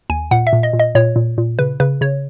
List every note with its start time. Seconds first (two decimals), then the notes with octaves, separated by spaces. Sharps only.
0.10 D#2 G#5
0.31 A#2 F#5
0.47 E5
0.53 A#2
0.63 D#5
0.73 A#2
0.80 D#5
0.95 A#2 C#5
1.16 A#2
1.38 A#2
1.59 C#3 B4
1.80 C#3 B4
2.01 C#3 C#5